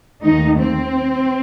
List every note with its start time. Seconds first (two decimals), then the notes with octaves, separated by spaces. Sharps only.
0.21 D#2 D#3 A3 D#4
0.57 C4